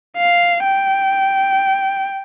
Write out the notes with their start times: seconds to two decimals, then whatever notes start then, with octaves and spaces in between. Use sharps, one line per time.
0.17 F5
0.64 G5